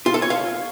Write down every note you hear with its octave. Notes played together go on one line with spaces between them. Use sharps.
F4
A4
C#5
F5